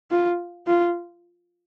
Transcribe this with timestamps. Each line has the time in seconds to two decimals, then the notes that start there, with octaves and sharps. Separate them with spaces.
0.11 F4
0.67 F4